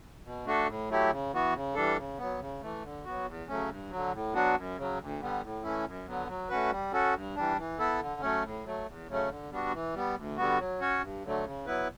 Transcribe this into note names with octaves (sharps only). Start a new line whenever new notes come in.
B2
A3 D4 F#4 A4
A2
F#3 A3 E4 G4
C#3
E3 B3 F#4
C#3
E3 G3 D4 A4
C#3
F#3 B3
C#3
E3 A3
D3
F#3 B3 F#4
E2
C#3 F#3 A3 C#4
G2
D3 F#3
A2
F#3 B3 D4 F#4
F#2
C#3 F#3
D2
D3 G3 B3
A2
E3 A3 C#4 E4
F#2
D3 F#3 B3
F#3
A3 C#4 F#4 B4
G3
C#4 F#4 A4
G2
E3 G3 D4
E3
B3 E4 A4
D3
F#3 A3 C#4
A2
F#3 A3
E2
C#3 F#3 A3 C#4
D3
G3 B3 D4 F#4
E3
G3 B3
D2
D3 G3 B3 F#4
F#3
C#4 F#4 C#5
G2
D3 F#3 A3
C#3
F#3 B3 E4 B4